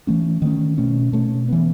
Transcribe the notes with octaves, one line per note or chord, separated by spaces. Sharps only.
E3 A3 C#4
D#3 A3 C#4
B2 A3 C#4
B2 A3 C#4
E3 B3